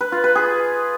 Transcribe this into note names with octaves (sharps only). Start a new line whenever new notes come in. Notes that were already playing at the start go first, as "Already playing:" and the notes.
B4
F4
B4
G#4